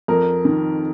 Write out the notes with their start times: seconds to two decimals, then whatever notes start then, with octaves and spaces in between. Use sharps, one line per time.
0.08 F2 A#4
0.45 D#3